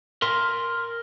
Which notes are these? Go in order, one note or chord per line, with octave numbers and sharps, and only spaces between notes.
A#4 C6